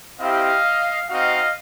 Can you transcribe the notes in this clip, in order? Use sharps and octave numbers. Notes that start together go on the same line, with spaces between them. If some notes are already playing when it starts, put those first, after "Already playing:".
C4 E4 G4 D#5 F5
C4 D#4 F#4 D#5 F5